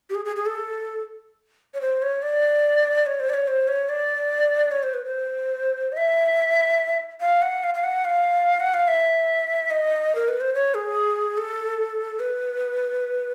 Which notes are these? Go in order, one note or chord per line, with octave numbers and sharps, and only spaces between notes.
G4
G#4
G#4
G#4
A4
C#5
C5
C#5
D5
C#5
C5
D5
C#5
C5
C#5
D5
C#5
C5
B4
C5
D#5
E5
F5
F#5
F5
F5
F#5
F5
F#5
F5
E5
D#5
A#4
B4
C5
C#5
G#4
A4
B4